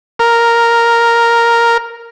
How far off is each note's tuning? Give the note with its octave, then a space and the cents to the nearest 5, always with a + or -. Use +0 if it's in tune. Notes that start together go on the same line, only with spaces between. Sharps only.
A#4 +0